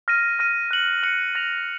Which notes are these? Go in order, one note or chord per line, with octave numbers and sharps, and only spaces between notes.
F6 A#6 D#7
F6 A#6 D#7
F#6 C#7 F#7
F#6 C#7 F#7
F#6 A#6 F7